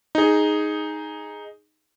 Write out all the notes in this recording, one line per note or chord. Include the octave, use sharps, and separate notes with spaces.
D#4 G#4